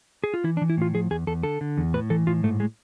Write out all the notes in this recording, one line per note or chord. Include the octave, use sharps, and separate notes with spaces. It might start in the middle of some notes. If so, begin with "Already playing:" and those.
G#4
F4
E3 E4
D4
E3
E4
A2 F4
F3 G#4
E2 G#4
E2 A4
D3 A4
D3
E2
A2 B4
E3 A4
A2 F4
G#2 A3
G#3